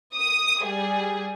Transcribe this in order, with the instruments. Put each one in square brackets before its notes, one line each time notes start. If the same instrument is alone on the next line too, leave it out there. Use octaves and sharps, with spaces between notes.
[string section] D#6
G3 G#4